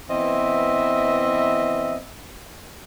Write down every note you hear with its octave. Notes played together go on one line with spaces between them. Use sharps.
E3 B3 C4 D#5 E5